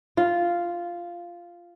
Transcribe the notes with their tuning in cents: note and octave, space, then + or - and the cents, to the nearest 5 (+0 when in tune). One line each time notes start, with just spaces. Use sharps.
F4 -5